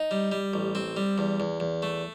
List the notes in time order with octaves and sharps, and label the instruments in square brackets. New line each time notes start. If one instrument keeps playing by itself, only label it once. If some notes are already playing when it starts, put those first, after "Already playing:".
Already playing: [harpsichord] D#4
G3
G3
A1
C4
G3
E2
E2
E2
A3